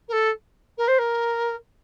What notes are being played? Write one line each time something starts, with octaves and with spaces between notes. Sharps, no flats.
A#4
A4
A#4
C5
A#4